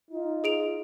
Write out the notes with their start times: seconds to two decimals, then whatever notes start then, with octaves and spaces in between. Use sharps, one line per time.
0.10 D#4 F4
0.44 G#4 D7 F7